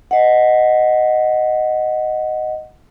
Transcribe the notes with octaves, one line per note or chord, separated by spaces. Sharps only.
D#5 F#5